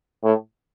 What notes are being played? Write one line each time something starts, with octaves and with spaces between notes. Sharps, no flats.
A2